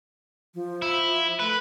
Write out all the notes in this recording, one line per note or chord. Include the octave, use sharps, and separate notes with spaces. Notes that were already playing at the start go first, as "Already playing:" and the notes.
F3
E4
A3 B4